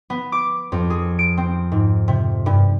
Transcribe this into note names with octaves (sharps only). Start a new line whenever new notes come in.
B3
D6
F2
G#4
D7
C4
G#2
C3
G2